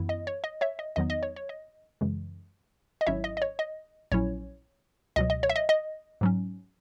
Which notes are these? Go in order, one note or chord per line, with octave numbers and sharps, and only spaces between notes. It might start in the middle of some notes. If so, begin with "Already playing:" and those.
Already playing: F#2 E3 B3 E4
D#5
C#5
D#5
C#5 E5
D#5
E2 D#3 F#3 B3 D#4 D#5
D#5
C#5
C#5
D#5
F#2 C#3 E3 G#3
D#5
G#1 G#2 F#3 C#4 E4 C#5 E5
D#5
D#5
C#5
D#5
A#1 A#2 F#3 C#4 E4 C#5
C#2 B2 F#3 D#5
D#5
C#5
E5
D#5
D#5
G#2 F#3 C#4